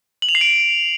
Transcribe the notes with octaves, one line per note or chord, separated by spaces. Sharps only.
F#7
F7
C7
D7